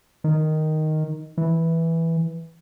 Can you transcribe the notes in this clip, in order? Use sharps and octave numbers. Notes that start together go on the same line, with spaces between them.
D#3
E3